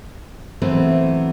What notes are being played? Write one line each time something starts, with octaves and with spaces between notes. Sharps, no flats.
E3 F#3 A3 B3 C4